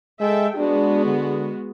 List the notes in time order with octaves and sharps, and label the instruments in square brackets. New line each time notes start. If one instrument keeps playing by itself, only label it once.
[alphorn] G#3 [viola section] A4 E5 G5
[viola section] G#3 B3 F#4 [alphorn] D4
[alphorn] D3